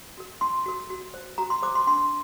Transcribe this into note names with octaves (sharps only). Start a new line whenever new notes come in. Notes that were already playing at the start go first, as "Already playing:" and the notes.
F#4 A#4
D#4 C6
F#4 A#4
F#4
C5
F#4 A#5
C6
C5 D6
C6
D4 C6